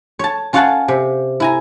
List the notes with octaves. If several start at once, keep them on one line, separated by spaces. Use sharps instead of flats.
C#5 A5
C#4 F4 C#5 F5 F#5 A5
C3
E4 G#5 A#5